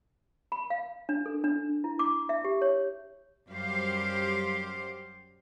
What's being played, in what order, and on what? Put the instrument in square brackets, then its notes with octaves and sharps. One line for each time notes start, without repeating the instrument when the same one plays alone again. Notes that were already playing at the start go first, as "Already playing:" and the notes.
[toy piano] B5
F5
D4
A4
D4
E4
D6
E5
G4
C#5
[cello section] F#2 G3 G4 C5 F5